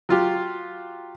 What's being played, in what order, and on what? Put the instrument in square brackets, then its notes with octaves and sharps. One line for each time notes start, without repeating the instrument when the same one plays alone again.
[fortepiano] F#3 F4 G4